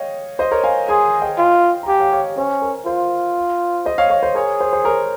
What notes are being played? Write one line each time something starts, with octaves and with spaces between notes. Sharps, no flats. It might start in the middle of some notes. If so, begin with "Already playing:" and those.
Already playing: C#5 D#5 F5 G5
C5 D#5
A#4 C#5
F5 G#5
G#4 G#5 C6
D#5 G5
F4
A#5
G4 F5 G#5
C#5 F5
C#5 F5
C#4 C5
A#4
F4 C5
C5 D#5
C#5 F5
C#5 F5
C5
G#4 A#4 C#5
C5
C5
A#4 C#5